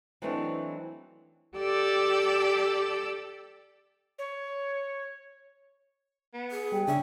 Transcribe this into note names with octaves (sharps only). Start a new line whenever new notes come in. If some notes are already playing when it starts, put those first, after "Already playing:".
E3 F#3 A3 C4 D4 D#4
G4 A4 D5 E6
C#5
B3
G#4
G3 G5
C#3 C#4 D4 E5